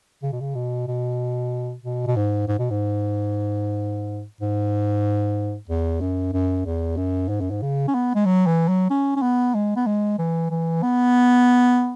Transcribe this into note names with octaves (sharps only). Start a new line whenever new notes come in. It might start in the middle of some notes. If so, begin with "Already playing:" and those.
C#3
B2
C#3
B2
B2
B2
B2
G#2
G#2
B2
G#2
G#2
E2
F#2
F#2
E2
F#2
G#2
F#2
G#2
C#3
C#4
B3
G#3
F#3
E3
F#3
C#4
C#4
B3
G#3
B3
G#3
E3
E3
B3